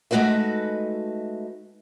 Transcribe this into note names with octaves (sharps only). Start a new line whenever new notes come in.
G#3 A3 D#4 F#4 B4 E5